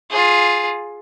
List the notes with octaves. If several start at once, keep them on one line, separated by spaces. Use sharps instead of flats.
F4 G#4